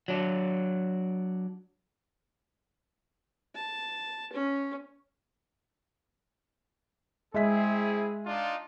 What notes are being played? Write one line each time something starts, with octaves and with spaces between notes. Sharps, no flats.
F#3 D4
A5
C#4
G#3 C4 E4 G#4 E5 B6
D4 D#4 F4